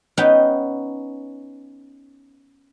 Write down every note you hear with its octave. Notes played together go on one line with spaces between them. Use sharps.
B3 C#4 D#4 B4 G5